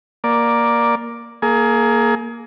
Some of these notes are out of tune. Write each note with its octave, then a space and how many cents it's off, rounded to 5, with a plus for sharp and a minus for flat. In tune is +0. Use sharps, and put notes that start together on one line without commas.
A#3 +5 D5 +0
A#3 +0 G#4 +30